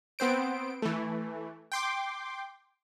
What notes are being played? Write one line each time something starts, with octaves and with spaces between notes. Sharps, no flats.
B3 C4 C5 D7
E3 A3
G5 C6 D6